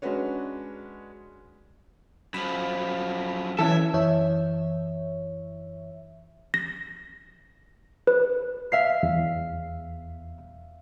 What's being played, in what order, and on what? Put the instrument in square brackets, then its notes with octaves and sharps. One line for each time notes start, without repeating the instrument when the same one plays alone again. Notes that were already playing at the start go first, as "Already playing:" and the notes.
[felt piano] G#3 C#4 D4 F#4 B4 C#5
[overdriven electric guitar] F#2 F3 [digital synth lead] B5
[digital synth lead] E3 [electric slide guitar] C#4 E4 A4 [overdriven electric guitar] E5
[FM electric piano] F#2 E3 C#5 E5
[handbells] A#6
B4
[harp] E5 F5 C7
[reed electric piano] E2